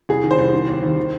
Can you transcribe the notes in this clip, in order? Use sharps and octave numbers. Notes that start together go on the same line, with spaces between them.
C2 G#4
D#3
C5
C2
D#3
D#2
D#2
D#3